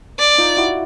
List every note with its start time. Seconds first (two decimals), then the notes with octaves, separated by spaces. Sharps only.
0.19 D5
0.38 D#4 F4
0.57 E4 F#4